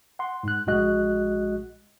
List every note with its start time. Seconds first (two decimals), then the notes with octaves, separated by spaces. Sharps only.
0.19 F#5 C6
0.43 G#2 F#6
0.67 A#1 G#3 F#4 D#5 F#6